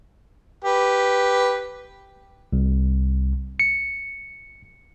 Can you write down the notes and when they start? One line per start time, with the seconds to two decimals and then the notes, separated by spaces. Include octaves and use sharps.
0.65 G4 B4
2.53 C2
3.60 C#7